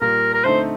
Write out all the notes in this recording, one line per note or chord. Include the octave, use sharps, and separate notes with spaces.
A#2 G3 A#3 A#4
A#4
D3 A3 C4 D#4 C5